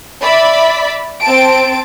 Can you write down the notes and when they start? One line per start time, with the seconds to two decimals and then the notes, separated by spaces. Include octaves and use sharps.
0.22 D5 E5 B5
1.21 C4 A5 D7